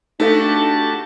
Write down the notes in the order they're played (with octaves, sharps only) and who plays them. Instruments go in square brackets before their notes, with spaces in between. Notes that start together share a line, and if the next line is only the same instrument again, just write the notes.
[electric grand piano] A3 [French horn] D4 [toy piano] D#4 A4 F5 [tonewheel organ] F#4 G4 A5